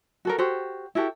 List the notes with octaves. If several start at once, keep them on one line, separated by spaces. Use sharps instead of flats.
F#4 A4 A#4
F#4 G4 A4 C5
E4 F#4 G4 A4